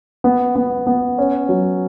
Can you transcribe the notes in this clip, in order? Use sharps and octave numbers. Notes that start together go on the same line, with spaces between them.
B3
B3
B3
C#4
F#3